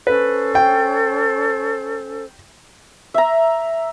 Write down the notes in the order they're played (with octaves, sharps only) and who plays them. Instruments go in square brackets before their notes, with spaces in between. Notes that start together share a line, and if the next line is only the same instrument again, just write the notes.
[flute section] C#4 A4 C5 [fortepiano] B4
[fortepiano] G5
[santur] E5 A#5